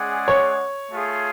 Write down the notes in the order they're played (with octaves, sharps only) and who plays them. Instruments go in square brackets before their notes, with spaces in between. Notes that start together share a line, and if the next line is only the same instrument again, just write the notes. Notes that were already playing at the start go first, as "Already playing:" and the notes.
Already playing: [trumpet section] G#3 C#4 G#4 D5 F#5
[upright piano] C#5
[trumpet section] A3 F4 G#4